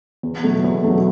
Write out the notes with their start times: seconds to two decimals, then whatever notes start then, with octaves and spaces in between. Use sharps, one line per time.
0.23 E2
0.43 B2 F#3 A3
0.64 E2
0.84 B2 F#3 A3